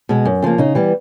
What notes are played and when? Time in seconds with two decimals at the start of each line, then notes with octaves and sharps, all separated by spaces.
0.09 B2 G#3
0.25 F#2
0.42 C#3 F3 A#3
0.58 C#3 D#4
0.75 E3 G3 B3